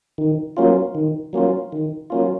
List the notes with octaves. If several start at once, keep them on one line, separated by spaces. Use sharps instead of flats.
D#3
F#3 A#3 C#4 F4
D#3
F#3 A#3 C#4 F4
D#3
F#3 A#3 C#4 F4